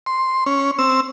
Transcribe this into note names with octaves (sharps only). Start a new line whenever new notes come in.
C6
C#4
C4 E6